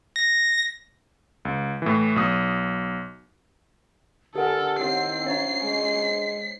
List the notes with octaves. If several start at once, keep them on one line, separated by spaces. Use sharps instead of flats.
A#6
C#2
A2 E3
B1 D#6
D3 G4 A4 A#4 F#5 G#5
D#3 C4 E4 C#5 F#5 C7
C#4 D4 C5 C#5
G#3